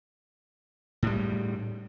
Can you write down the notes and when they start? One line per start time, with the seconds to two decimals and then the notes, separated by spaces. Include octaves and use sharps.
1.03 A2 G3